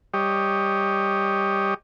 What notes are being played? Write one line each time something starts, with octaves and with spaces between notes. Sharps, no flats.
G3 G4 C#5 D#5